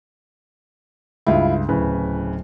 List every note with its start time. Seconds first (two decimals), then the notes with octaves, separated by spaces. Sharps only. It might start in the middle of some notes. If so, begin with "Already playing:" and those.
1.27 C#2 G2 E4 F4
1.69 D1 A2 C#3 B4